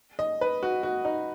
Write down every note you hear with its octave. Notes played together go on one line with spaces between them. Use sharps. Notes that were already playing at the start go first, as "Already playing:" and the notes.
D#5
B4
F#4
F#4
D#4